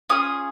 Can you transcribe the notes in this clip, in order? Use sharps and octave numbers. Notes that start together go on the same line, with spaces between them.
C#4 F4 G#4 D#6